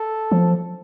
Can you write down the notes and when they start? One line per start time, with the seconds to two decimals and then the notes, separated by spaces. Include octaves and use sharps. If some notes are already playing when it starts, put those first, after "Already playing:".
Already playing: A4
0.32 F3